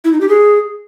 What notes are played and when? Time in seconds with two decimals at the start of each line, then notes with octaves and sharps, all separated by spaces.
0.05 E4
0.13 D#4
0.21 G4
0.29 G#4